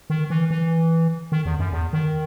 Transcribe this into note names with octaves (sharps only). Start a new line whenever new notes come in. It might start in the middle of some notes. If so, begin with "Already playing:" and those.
D#3
E3
E3
D#3
E2
F#2
E2
D#3